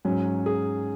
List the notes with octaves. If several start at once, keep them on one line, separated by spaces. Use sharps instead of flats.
G#2 F#3 C#4
G#4